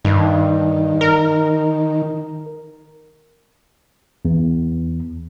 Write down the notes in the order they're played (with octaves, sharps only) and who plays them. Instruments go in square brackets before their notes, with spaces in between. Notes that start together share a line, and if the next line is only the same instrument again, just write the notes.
[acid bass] G2 [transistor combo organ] D#3
[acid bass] A#4
[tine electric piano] E2